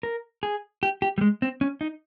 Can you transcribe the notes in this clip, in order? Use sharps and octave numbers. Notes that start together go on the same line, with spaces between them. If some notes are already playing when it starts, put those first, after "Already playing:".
A#4
G#4
G4
G4
G3
G#3
C4
C#4
D#4